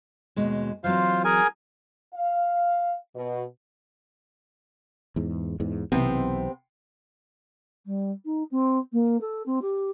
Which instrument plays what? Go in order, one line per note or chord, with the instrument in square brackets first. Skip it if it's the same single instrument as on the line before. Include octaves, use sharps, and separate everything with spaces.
[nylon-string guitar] D#2 B2 G#3
[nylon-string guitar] E3 F#3 C4 [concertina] F4 C5 F5
[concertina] G#4 A#4 G#5
[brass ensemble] F5
B2
[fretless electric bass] E2 G#2
E2 G#2
[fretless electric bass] B1 E3 [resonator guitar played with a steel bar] C3 B3 C4
[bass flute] G3
D#4
C4
A#3
A4
C4
G4